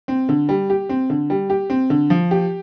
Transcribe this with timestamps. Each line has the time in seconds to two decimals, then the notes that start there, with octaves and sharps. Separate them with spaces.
0.08 C4
0.29 D3
0.49 G3
0.70 G4
0.89 C4
1.10 D3
1.30 G3
1.50 G4
1.70 C4
1.90 D3
2.10 F3
2.31 G4